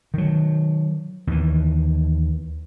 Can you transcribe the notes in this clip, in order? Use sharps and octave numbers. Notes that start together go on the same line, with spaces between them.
D#3 F#3
D#2 E3